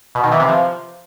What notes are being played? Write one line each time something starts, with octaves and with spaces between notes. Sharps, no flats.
B2
D#3
E3
C3
F3